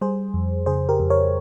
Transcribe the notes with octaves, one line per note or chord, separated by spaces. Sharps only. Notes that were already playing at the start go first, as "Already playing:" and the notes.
G3 G#4 C5
F2
C#3 G#4 C5
G4 A#4
F2
A#4 C#5